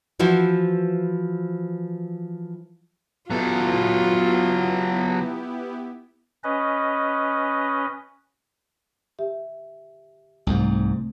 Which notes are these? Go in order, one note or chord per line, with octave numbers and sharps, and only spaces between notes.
E3 F3 E4 F#4 C5
F#3 B3 E4 F4 G4 A4
C#4 B4 D#5
G4 E5
C2 G#2 C3 A3